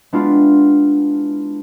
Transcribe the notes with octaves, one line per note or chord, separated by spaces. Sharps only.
G#3 B3 D4 E4 F4 G4